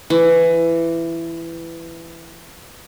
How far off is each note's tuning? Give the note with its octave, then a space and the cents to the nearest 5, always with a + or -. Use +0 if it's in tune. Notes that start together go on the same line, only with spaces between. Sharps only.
E3 +15